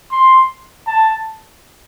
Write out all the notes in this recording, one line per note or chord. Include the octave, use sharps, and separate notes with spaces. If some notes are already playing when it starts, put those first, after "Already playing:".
C6
A5